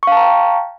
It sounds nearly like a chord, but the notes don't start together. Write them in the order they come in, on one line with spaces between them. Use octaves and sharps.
C#6 F5 A5 A#5 G5